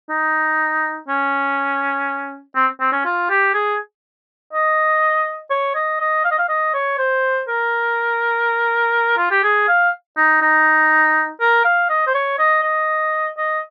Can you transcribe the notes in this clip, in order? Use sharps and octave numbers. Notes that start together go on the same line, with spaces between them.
D#4
C#4
C4
C4
C#4
F4
G4
G#4
D#5
C#5
D#5
D#5
F5
D#5
F5
D#5
C#5
C5
A#4
F4
G4
G#4
F5
D#4
D#4
A#4
F5
D#5
C5
C#5
D#5
D#5
D#5